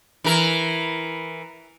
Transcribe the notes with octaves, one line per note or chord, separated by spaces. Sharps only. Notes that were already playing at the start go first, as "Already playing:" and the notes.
E3 A#4